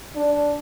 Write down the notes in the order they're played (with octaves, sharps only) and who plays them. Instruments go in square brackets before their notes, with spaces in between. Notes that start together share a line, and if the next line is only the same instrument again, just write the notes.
[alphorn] D4